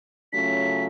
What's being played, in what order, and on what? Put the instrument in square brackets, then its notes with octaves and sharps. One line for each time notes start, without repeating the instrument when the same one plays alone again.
[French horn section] C#3 F#3 A3 C#4 F4 [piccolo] B6